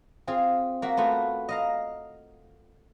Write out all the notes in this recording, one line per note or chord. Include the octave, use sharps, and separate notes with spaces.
C4 F4 G#4
A#3 F#4 E5
A3 B3 F4 F#4
D#5 F5 A#5